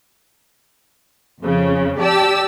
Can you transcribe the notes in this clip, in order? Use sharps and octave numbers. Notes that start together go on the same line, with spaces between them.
F2 C#3
G4 D5 A5 E6